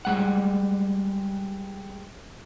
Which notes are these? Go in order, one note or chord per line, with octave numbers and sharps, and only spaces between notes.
G3 G#3 F#5